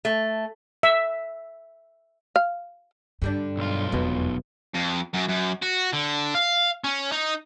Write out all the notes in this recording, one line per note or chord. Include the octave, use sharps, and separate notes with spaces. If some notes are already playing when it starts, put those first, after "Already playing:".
A3
E5
F5
G2 D3 G3 D4
B1 F4
F1 E2 B2 G#3 B3
F2
F#2
F#2
F#4
D3
F5
C#4
D#4